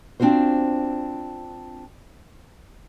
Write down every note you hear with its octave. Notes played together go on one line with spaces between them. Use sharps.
C4 D4 F4 F#4 C5